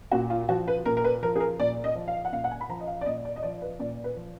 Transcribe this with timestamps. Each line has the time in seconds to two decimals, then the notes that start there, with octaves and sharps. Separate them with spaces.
0.12 A#2 F#4
0.30 F4
0.49 F3 F#4
0.68 B4
0.86 A#2 A#4
0.97 A#4
1.04 B4
1.23 F3 A#4
1.36 G#4
1.40 A#4
1.59 A#2 D5
1.84 D#5
1.95 F3
2.08 F5
2.25 F#5
2.32 A#2 F5
2.44 F#5
2.51 G#5
2.61 B5
2.69 F3 A#5
2.80 D#5
2.87 F5
3.01 D5
3.06 A#2 D#5
3.25 D5
3.36 D#5
3.43 F3 D5
3.62 B4
3.80 A#2 D5
4.04 B4
4.16 F3